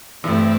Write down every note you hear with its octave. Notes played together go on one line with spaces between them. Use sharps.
E2 G2 E3 A3 C4 E4